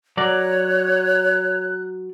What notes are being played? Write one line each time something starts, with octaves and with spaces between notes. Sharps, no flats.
F#3 A#4 C#5 D5 F#6